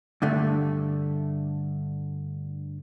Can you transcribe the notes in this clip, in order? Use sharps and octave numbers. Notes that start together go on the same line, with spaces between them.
G2 D3 A3